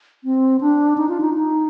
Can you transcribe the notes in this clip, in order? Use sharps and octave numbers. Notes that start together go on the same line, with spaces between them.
C4
D4
D#4
F4
D#4
D#4